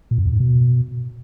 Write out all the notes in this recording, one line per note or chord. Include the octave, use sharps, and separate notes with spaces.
A#2
F#2
E2
G#2
B2